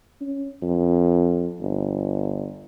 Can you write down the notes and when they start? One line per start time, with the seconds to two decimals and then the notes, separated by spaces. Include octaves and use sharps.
0.21 C#4
0.62 F2
1.60 G1